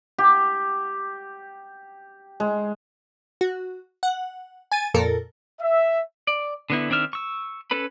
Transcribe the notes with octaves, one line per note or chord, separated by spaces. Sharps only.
G4
G#3
F#4
F#5
G#5 A6 D#7
F2 A#2 A4 A#4
E5
D5
D3 B3 E4
D#3 C4 D4 E5 F6
C#6 E6
C#4 A4 B4 B5